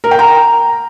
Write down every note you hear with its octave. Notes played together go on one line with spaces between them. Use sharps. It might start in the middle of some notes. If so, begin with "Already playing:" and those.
A#4
G5
A#5